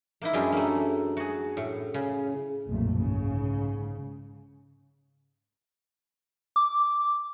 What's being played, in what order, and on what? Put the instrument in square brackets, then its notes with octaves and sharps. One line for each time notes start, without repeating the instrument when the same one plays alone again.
[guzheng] A#3 D#4 E4
F#2 G#3 C#4 D4 G4 G#5
A3 A#3
F#4 G#4
A2
C#3
[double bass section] F#1 B1 F2 A#2 A3
G#2 C#3
[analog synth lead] D6